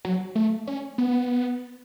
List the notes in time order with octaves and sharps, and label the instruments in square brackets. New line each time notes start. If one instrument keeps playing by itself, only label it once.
[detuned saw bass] F#3
A3
C#4
B3